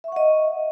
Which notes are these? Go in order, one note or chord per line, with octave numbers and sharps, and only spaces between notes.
D#5 E5 F#5 C#6